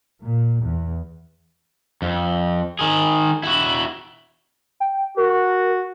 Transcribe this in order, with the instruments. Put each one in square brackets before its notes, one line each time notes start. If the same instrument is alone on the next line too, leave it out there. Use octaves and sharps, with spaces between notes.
[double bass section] A#2
E2
[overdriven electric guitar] F2
D#3 G#4
E4 F#4
[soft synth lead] G5
[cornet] F#4 [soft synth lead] A#4